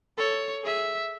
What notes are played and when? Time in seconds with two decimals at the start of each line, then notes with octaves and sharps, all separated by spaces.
0.18 A4 C#5
0.64 G#4 E5